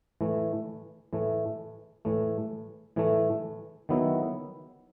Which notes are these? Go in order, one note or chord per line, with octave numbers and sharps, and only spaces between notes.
A2 E3 A3
A2 E3 A3
A2 E3 A3
A2 E3 A3
D#3 F#3 B3 E4